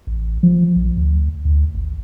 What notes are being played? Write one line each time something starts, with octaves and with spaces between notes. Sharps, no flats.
A1
F3
A#1
D2
D2
G#1